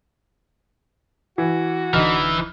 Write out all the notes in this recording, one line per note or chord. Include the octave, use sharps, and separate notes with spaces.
E3 F#4
D1 D3 E3 D#4 F6